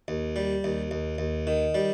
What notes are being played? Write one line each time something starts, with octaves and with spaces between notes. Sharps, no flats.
D#2
G3
D#2
D#2
D#2
D#3
G3